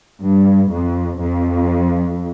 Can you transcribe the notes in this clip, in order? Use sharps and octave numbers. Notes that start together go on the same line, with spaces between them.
G2
F2
F2